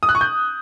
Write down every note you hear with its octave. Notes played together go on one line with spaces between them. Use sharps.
D#6
F#6
C#6
G6